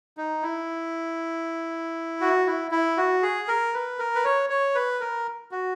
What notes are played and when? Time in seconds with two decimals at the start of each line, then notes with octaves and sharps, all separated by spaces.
0.17 D#4
0.43 E4
2.21 F#4
2.46 E4
2.71 E4
2.97 F#4
3.23 G#4
3.48 A#4
3.74 B4
3.99 A#4
4.15 B4
4.24 C#5
4.50 C#5
4.75 B4
5.00 A#4
5.51 F#4